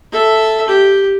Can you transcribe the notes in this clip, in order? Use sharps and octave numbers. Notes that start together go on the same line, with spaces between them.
A4 E5
G4